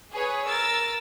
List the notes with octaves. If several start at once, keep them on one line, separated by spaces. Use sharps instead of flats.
G#4 B4 C#5
A#4 E6 A6